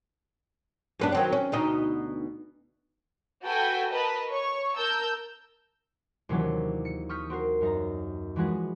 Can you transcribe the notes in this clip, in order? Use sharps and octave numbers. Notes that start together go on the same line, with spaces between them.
F#2 B3 D4
D#3 F#3 C4
C#4
D2 B2 D#4
F#4 A4 B4 G5 G#5
A#4 B4 D#5 A5
C#5 C#6
A#4 A5 E6 G6
D#2 C3 E3 F#3 C#4 D4
C#7
C#6 D#6 F6 G6 B6
C4 F#4 A#4 C7
F#2 D#4 A#5
E3 F3 G#3 F#4 G#4 B4